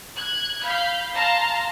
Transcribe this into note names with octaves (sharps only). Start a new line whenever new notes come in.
F#6 G#6
F5 B5 G6
F5 A5 A#5 C6 A#6